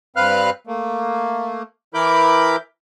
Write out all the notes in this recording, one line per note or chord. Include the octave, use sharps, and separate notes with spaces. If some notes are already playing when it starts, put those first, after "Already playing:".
G2 C4 B4 F5 F6 F#6
A3 A#3
E3 E4 A#4 B5 D6 G6